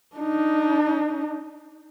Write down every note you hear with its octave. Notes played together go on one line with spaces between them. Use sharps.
D4 D#4